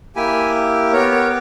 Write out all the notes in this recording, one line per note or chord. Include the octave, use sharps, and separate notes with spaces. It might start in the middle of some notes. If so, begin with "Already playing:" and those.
A#3 E4 G4 G#5 B5
B3 G4 A#4 C#5
A#4 C#5